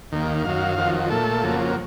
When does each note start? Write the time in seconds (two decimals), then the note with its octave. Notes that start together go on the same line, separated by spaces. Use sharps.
0.12 D#2 D#3 A#3
0.44 F#2 D#3 F#3 F5
0.78 F2 D#3 F#3
1.10 A#2 A3 A4
1.43 F2 C#3 F#3 A#3